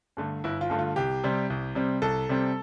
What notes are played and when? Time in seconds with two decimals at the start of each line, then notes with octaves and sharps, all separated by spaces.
0.17 G2 D3 A3
0.44 G1 E4
0.61 F4
0.70 G2 D3 A3
0.79 F4
0.96 C2 G4
1.24 C3 G3 C4
1.50 C2
1.75 C3 G3 C4
2.02 C2 A4
2.29 C3 G3 C4